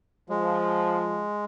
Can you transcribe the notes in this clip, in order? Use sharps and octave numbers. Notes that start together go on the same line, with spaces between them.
F3 G#3